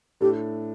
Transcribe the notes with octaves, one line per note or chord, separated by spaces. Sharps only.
A2 A3 D4 G4 A4